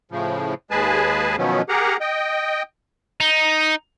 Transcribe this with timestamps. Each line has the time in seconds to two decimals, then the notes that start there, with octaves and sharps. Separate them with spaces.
0.11 A2 C#3 F3
0.71 D#2 G#3 G#4 B4 G#5 A5
1.38 B2 D#3 F3 F#3 B3 C#4
1.69 G4 G#4 A#4 F#5 A#5
2.01 D#5 G5
3.21 D#4